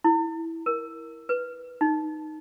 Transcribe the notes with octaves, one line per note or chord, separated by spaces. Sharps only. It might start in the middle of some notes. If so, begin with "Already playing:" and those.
E4
A#4
B4
D#4